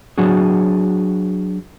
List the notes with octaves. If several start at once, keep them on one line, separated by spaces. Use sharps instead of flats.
F#3 D4 F#4 G#4